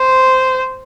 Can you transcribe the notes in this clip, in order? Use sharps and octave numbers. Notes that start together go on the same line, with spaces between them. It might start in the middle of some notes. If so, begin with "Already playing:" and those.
Already playing: C5